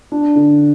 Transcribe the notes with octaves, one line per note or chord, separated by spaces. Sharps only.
D4
D3